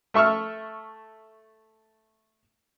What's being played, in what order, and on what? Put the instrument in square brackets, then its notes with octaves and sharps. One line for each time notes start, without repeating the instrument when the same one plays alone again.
[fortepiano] A3 E5 C#6 E6 F6